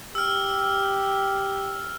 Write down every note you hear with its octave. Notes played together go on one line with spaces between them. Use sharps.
G4 E6 F6